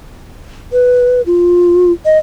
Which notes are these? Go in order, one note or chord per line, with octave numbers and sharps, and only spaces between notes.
B4
F4
D#5